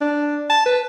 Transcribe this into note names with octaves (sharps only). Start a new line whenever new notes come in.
D4
A5
B4